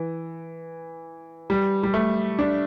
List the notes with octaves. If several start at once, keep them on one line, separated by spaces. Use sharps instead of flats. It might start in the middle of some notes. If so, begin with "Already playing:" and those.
Already playing: E3
G3
G3
A3
D4